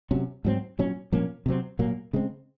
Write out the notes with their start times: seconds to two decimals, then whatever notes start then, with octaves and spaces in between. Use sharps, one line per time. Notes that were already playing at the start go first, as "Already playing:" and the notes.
0.11 C3 F#3 C#4
0.45 G#2 F#3 C4
0.79 A#2 F#3 C#4
1.12 A#2 F3 A#3 C#4
1.46 C3 F#3 C4
1.79 A#2 F#3 A#3
2.13 C#3 G#3 C4